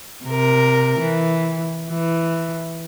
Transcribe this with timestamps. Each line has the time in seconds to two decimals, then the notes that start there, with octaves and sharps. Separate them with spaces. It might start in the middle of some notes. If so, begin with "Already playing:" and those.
0.25 C3 A#4
0.99 E3
1.90 E3